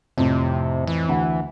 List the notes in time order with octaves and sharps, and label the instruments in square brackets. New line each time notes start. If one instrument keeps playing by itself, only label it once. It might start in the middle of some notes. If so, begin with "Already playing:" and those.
[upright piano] F2 A2 [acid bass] C3
[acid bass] E3
[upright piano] D2 F#5